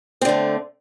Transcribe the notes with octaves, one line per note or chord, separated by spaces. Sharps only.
D3 A3 C4